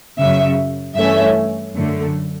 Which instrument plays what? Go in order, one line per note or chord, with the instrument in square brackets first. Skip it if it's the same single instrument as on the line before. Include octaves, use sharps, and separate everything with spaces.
[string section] F#2 C#3 F#3 E5
G2 E3 A3 C#4 E5
F#2 D3 A3